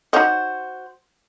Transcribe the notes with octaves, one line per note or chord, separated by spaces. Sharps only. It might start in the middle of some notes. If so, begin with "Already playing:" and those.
D#4 F#4 C5 C#5 D#5